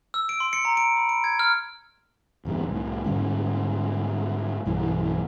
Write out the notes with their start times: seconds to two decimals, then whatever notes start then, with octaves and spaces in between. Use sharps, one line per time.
0.14 E6
0.29 D7
0.40 C6
0.53 C#7
0.65 A#5
0.77 D7
0.96 B5
1.09 D7
1.24 G#6
1.39 F6
2.45 D1 E2 G2 C3
2.69 C2 A2
3.06 G#2 D3 G3 C#4
4.66 B1 G2 E3